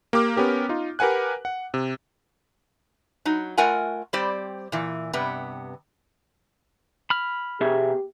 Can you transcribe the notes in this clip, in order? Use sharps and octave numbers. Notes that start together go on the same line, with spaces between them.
A#3 G4 D6 F6
B3 C#4 G4 A#4
D#4 F4
G4 A#4 B4 F#5 G#5 F#6
F#5
C3
F#3 D#4
A3 F4 A#4 F#5 G#5
G3 C4 G4 C5 D5
A#2 E3
G2 C3 B3
B5 F6
B2 G4 G#4 E5